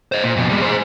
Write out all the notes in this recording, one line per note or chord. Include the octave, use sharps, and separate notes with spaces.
C5 D#5
A#2
F2 B2
G3 G#3
G#4 C5